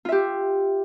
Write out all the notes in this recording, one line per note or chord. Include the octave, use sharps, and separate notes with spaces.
F4 G4 E5